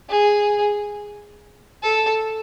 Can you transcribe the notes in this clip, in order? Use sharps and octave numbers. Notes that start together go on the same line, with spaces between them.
G#4
A4